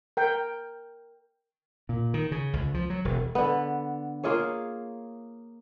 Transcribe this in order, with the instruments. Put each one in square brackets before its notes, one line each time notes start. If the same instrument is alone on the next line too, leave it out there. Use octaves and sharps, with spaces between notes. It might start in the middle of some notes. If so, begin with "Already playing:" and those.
[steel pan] A#4 G5
[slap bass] A#2
D#3
C#3
C#2
F3
F#3
E1
[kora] D3 B3
A#3 F4 G#4 C#5